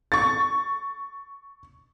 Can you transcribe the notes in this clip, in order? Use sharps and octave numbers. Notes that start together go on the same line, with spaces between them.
C#6 A6